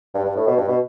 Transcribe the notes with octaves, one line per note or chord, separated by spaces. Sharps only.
G2
G2
A2
B2
G2
B2